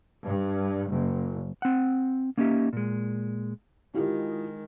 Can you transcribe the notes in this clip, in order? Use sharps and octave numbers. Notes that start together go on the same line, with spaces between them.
G2
F#1
C4 F#5
A#3 C#4 D#4 F#4 G4 E5
A#2 G#3
D#3 G#3 E4 F4 G4